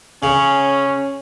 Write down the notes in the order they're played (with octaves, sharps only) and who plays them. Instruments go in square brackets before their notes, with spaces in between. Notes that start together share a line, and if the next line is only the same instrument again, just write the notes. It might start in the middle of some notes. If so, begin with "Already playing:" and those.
[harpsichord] C#3 [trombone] C#4